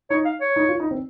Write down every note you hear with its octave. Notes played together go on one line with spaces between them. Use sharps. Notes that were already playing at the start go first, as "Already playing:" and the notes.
D#4 C#5
F5
C#5
D#4
F4
D#4
C4